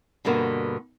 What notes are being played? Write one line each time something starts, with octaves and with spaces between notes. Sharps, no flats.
G2 B2 D3 A#3 B3